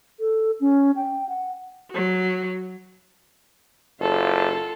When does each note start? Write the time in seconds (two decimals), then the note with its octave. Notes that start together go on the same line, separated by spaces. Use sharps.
0.20 A4
0.60 C#4
0.96 G5
1.29 F#5
1.91 F#3 F#4
4.00 F#1 F4 A4